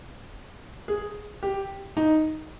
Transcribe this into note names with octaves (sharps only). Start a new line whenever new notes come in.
G#4
G4
D#4